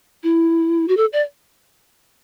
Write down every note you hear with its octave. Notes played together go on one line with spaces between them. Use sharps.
E4
F#4
A4
D5